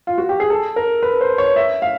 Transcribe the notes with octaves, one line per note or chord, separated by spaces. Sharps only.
F4
F#4
G4
G#4
A4
A#4
B4
C5
C#5
E5
F5